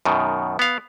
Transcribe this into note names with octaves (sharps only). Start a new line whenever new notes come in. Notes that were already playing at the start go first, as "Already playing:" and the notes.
F#2 B2 D#3
B3 F5